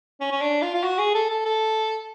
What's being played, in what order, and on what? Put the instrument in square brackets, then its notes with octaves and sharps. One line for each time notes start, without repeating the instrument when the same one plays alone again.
[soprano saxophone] C#4
C#4
D4
F4
F4
F#4
G#4
A4
A4
A4